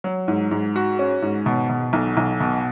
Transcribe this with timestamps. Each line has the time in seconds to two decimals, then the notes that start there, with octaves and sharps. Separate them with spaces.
0.04 F#3
0.28 G#2
0.51 G#2
0.76 F#4
0.99 C#4
1.22 G#2
1.46 B2
1.69 B2
1.93 B1
2.17 B1
2.40 B2